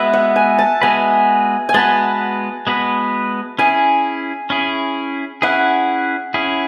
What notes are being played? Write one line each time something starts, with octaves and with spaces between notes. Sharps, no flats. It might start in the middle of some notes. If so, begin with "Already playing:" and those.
Already playing: G#3 B3 F#4 B4 E5
F#5
G#5
A5
G#3 B3 F#4 B4 G#5
G#5
G#3 B3 F#4 B4 A5
G#3 B3 F#4 B4
C#4 E4 G#4 G#5
C#4 E4 G#4
C#4 E4 G#4 F#5
C#4 E4 G#4